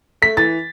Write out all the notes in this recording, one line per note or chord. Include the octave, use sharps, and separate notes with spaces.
A3 B6
E3 A6